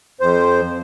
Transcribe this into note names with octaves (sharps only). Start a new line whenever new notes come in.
F2 C5